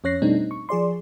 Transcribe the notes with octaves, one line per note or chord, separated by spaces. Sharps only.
F2 C#4 C#5 F#6 A#6 C7
B2 G3 A3 C4 D4 D#4
D#4
C#6
F3 G#4 D5 C6